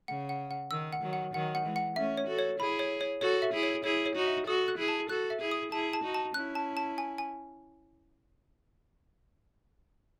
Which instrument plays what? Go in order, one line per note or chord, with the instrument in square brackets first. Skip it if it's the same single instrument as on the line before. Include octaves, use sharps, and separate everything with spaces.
[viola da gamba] C#3 [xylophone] F#5
[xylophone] F#5
F#5
[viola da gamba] D#3 [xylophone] E6
[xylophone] F#5
[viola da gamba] D#3 F#3
[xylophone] F#5
[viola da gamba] D#3 F#3 [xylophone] F#5
[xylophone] F#5
[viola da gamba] E3 G#3
[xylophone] F#5
[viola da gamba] A3 C#4 [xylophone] E5
[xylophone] C#5
[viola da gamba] F#4 A4
[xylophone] C#5
[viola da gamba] E4 G#4 [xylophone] B5
[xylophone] C#5
C#5
[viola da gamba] F#4 A4 [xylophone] C#5
[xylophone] E5
[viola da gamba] E4 G#4
[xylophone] C#5
[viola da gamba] E4 G#4 [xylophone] C#5
[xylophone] C#5
[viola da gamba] D#4 F#4
[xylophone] E5
[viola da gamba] F#4 A4 [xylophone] D#6
[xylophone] F#6
[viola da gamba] E4 G#4
[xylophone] A5
[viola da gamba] F#4 A4 [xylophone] F#6
[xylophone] E5
[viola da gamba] E4 G#4
[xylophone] D#6
[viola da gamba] E4 G#4 [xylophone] A5
[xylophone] A5
[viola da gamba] D#4 F#4
[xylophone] A5
[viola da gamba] C#4 E4 [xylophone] F#6
[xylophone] A5
A5
G#5
G#5